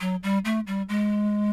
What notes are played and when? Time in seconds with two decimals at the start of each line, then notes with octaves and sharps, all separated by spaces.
0.01 F#3
0.23 G3
0.45 A3
0.67 G3
0.89 G#3